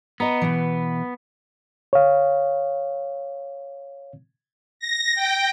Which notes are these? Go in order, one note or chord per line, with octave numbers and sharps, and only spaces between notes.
B3 D#5 A#5
B2 E3
C#5 F5
A#6
G5